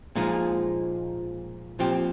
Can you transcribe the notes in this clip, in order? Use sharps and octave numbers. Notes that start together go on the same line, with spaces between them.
A#2 F3 G#3 D#4
A#2 F3 C4 G4